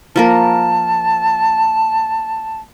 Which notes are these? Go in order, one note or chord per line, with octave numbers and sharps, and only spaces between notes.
F3 A#3 A#4 A5